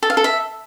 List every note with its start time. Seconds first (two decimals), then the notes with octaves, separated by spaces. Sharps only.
0.03 A4
0.10 F5
0.17 A4
0.24 E5